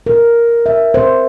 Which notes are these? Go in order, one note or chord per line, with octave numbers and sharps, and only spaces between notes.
A#4
E5
C5